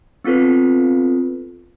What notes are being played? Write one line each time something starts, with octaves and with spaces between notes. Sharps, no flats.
B3 C4 F4 A4 B4